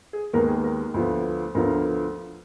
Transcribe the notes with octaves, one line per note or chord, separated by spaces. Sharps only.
G#4
D#2 D#3 G#3 B3 A#4
G#4
A#4
D2 D3 F3 B3
D2 D3 F3 B3 A#4